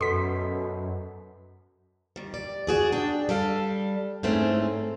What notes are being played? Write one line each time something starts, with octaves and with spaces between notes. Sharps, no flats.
F#2 B2 A4 C6 B6
D#3 G3
D5
F#4 G#4 D5
D4 G5
G3 A4 F5
G#2 E3 A3 C4 C#4